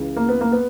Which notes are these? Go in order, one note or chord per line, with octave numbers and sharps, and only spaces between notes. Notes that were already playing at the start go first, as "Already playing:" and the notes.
Already playing: C#2 C#3 E3
A#3
B3
A#3
B3